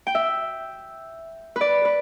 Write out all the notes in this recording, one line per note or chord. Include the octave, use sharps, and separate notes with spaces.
G5
E5
B4
D5
B4